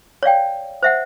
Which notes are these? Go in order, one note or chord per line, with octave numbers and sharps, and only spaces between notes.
C#5 D5 F5 G5
C5 E5 F#5